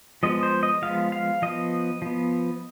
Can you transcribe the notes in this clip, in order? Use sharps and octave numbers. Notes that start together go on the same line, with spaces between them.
F3 G#3 B3 D#5
C5
D#5
F3 G#3 B3 F5
F5
F3 B3 D#5
F3 B3